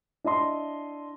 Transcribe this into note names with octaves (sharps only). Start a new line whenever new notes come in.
D4 E4 D#5 C6